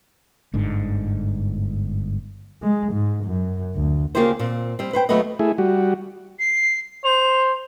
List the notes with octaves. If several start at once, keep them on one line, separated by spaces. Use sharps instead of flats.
G1 G#2 D3
G#3
G#2
F#2
D2
C#3 A#3 F4 G4 G#4 C5
A#2 C4
G3 C4
B4 C5 G5
D#2 F#3 A3 B3 B4 D#5
A3 E4 G#4
G3 F#4
C7
C5 F7